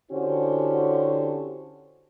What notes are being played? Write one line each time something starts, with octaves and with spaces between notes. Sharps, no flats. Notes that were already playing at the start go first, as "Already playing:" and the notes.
D3 C#4 E4 F#4 G4 C5